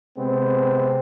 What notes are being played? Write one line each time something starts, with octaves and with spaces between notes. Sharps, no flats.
C3 G#3 B3 C4